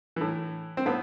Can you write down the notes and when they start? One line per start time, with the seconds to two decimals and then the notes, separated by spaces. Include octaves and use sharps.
0.16 A2 E3
0.77 C4
0.86 A2 B3